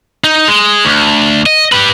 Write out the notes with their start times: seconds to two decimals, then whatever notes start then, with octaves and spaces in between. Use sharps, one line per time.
0.24 D#4
0.48 G#3
0.85 D2
1.46 D#5
1.72 G4 B4